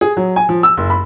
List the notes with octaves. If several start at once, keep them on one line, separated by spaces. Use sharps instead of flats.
G#4
F#3
G#5
F3
E6
F#1
B5